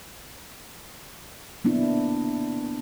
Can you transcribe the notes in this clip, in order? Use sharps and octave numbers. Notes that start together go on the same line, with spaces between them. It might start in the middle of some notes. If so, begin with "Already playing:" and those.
A#3 B3 D4 E4